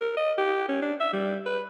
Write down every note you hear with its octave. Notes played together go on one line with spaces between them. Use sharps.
A#4
D#5
G4
C#4
D4
E5
G3
B4